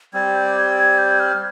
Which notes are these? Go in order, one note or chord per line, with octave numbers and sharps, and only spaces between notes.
G3 C4 G4 D5 G#6
G6
G#6
G#6
G6
F6